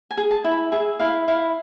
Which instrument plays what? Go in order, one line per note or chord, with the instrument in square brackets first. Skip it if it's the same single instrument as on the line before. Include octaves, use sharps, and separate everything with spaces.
[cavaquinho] G#5
G#4
A5
E4
B5
G#4 E5
E4 F5
E4 F5